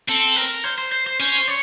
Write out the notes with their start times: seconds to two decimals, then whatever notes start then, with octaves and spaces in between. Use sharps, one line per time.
0.09 C4 A4
0.36 A#4
0.64 C5
0.78 C5
0.92 C5
1.07 C5
1.20 C#4 C5
1.48 C#5